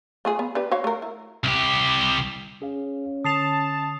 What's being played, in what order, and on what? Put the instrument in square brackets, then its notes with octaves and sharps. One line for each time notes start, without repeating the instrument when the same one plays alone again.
[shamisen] A3 F4 G#4
B3
D4 G4 B4
F#4 C#5 F5
A3 A#4
E4
[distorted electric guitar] C2 G4
[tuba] C#4 [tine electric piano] G#4 F5
[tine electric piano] D3 [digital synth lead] A5 [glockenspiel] D#6 C7 F7